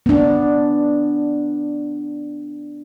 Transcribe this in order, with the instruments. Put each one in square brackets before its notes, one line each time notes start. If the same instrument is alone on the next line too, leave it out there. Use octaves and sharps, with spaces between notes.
[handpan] B3 D4